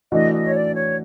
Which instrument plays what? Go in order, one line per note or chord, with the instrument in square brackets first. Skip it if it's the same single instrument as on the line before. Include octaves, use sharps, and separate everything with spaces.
[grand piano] E3 A3 D4 F#4 [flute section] D#5
[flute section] D#5
C#5
D5
C#5